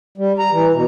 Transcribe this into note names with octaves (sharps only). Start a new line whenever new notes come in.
G3
A#5
E3
B2